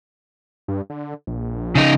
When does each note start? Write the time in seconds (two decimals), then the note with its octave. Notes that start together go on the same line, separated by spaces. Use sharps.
0.68 G2
0.90 D3
1.27 A#1
1.75 C#3 D#4